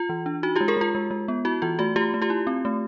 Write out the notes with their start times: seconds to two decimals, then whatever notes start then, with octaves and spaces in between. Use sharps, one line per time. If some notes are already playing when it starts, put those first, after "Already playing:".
Already playing: F4
0.09 E3
0.26 D4
0.43 D#4 F#4
0.56 F4 G4
0.61 G#3
0.68 G#4 A#4
0.77 G#3 F4
0.95 G#3
1.11 G#3
1.28 B3
1.45 E4 F#4
1.62 E3 F4
1.79 A3 F#4
1.96 A3 F4 G4
2.14 A3
2.22 F4 G4
2.30 E4
2.47 C4
2.65 A3